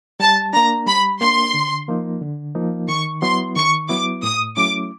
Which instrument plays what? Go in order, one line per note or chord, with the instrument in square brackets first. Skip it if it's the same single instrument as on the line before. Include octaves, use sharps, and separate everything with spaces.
[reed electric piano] G3 [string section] A5
[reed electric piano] A#3 D4 [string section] A#5
[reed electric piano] G3 [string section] B5
[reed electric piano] A#3 D4 [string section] C6
[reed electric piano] D3
F3 A#3 D#4
D3
F3 A#3 D#4
[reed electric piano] D#3 [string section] C#6
[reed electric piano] F#3 B3 E4 [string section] C6
[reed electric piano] D#3 [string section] C#6
[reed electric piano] F#3 B3 E4 [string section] D6
[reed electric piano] A2 [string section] D#6
[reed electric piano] F#3 A3 C#4 E4 [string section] D6